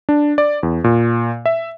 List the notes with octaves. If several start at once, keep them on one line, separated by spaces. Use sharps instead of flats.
D4
D5
E2
A#2
E5